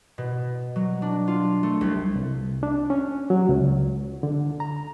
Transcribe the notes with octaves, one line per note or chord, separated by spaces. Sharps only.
B2
F#3
D4
F4
A3
C2
C2
D4
C#4
F#3
C#2
D3
A#5